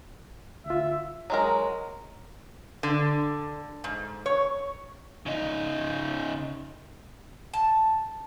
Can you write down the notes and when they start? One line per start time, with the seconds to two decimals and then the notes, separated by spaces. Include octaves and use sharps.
0.66 D2 F4 E5
1.30 F#3 G#3 A#4
2.83 D3
3.84 G#2
4.26 C#5
5.26 C#3 D#4
7.54 A5